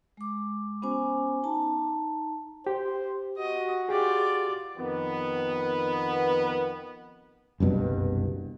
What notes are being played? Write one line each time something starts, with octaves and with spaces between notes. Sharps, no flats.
G#3 D6
B3 C#4 F#4 C5 G#5 D6
D#4 A5 A#5
G4 C5
F#4 D#5
F4 G4 G#4 D5
F2 D#3 B3
F#1 C2 G2 B2